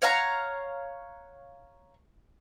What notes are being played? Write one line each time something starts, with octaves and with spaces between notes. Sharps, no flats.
C#5 F5 F#5 A#5